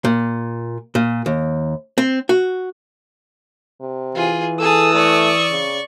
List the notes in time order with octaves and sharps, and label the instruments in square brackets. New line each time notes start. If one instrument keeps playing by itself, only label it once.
[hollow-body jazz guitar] A#2
A#2
D#2
C4
F#4
[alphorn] C3
[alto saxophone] E3 [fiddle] F4 G#4
[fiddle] G#4 A5 [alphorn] A4 [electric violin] D#6 E6
[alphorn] A3 [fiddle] D5 C#6
[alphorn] C#3